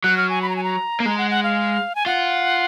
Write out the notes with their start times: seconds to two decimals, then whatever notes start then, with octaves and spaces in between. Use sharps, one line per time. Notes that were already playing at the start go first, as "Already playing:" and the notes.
0.04 F#3 F#6
0.17 F6
0.30 G#5
0.42 B5
0.49 A#5
0.56 G#5
0.63 A#5
1.00 A#3
1.05 G#3 A#5
1.18 F#5
1.31 F#5
1.43 F5
1.95 G#5
2.06 F4 F#5